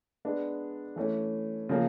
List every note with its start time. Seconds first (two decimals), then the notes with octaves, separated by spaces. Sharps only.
0.25 G#3 B3 D4
0.96 E3 A3 C#4
1.69 C#3 F3 A#3 C#4